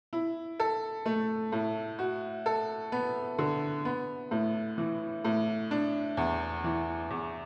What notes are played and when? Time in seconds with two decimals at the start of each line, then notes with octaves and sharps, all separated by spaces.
0.13 E4
0.60 A4
1.06 A3
1.52 A2
1.99 F#4
2.46 A4
2.92 B3
3.39 D3
3.85 B3
4.31 A2
4.78 E3
5.25 A2
5.71 D4
6.17 E2
6.64 E3
7.10 E2